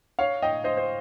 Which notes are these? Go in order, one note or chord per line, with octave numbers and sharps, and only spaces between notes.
C#5 F5
D#5 G5
C5 D#5
C5